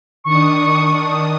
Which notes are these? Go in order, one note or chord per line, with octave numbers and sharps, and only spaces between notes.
D#3 D4 C#6 D#6